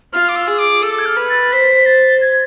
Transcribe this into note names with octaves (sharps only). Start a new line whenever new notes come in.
F4 F6
D6
E6
G#4
D6
A4 E6
G#6
F6
B4
A6
C5 B6
A6
G#6